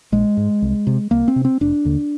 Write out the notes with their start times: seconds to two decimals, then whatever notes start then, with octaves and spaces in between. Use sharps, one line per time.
0.12 A#1 G#3
0.37 G#2
0.62 C2
0.87 C3
1.11 C2 A#3
1.28 C4
1.36 C3
1.45 C4
1.61 F1 D4
1.85 D#2 D3